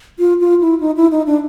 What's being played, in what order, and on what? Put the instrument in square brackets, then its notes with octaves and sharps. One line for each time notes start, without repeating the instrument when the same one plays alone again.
[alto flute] F4
F4
E4
D#4
E4
D#4
D4